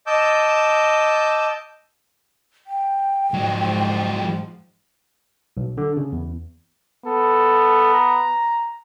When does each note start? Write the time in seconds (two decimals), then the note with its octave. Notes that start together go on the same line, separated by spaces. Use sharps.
0.07 D#5 A5 D6 E6 G6
2.67 G5
3.34 G#2 F3 F#3 G#3
5.57 B1
5.78 D3
5.97 C#3
6.12 E2
7.06 B3 A4
7.94 A#5